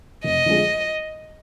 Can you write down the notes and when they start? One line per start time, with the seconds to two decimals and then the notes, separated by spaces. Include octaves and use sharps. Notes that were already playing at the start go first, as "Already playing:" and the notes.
0.24 F1 D#5
0.46 F2 D3 F3 G#3